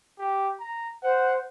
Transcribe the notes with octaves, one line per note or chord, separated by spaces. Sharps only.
G4
A#5
C5 F#5